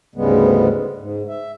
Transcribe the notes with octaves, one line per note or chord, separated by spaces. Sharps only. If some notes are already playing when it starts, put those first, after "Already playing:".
D2 G#2 C#3 G3 G#3 B3
G#2
E5